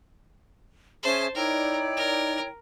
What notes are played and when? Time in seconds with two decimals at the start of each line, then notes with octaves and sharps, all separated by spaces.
1.03 C#4 G#4 C5 E5 A5
1.35 D#4 E4 A#4 C#5 D5 G5
1.97 A#4